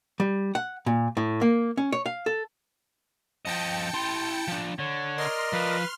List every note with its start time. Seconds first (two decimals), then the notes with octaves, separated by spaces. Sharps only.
0.20 G3
0.55 F#5
0.86 A#2
1.17 A2
1.41 A#3
1.77 C#4
1.92 C#5
2.06 F5
2.26 A4
3.45 F3 D#5 G5 A5 C#7
3.94 E4 C6
4.48 F3 D4
4.79 D3 C#5
5.18 A#4 D5 D#5 C6 F6
5.53 F3 B4